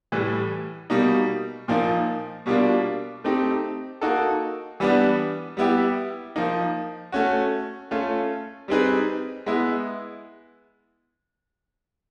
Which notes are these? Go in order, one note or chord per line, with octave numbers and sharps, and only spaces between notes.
A2 E3 G3
B2 G3 A#3 D#4
A#2 F3 A#3 D#4
B2 G3 A#3 D4 F4
A3 C4 D#4 G4
A#3 D#4 F#4 A4
E3 G3 B3 D4
G3 B3 E4 G4
F3 A#3 D#4
A3 C#4 F#4
A3 C#4 F4
G3 C4 D#4 G#4 B4
G#3 B3 E4